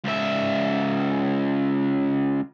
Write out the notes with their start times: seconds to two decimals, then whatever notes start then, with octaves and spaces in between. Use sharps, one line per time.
0.05 C#2 E5